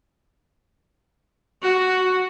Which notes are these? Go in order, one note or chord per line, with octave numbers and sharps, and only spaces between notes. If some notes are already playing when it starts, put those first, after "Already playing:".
F#4